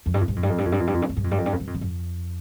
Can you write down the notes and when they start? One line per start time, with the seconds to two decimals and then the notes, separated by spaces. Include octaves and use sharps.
0.06 F2
0.14 G2
0.21 F2
0.28 G2
0.36 F2
0.43 G2
0.50 F2
0.58 G2
0.65 F2
0.72 G2
0.80 F2
0.87 G2
0.94 F2
1.02 G2
1.09 F2
1.17 G2
1.24 F2
1.31 G2
1.38 F2
1.46 G2
1.53 F2
1.60 G2
1.67 F2
1.74 G2
1.81 F2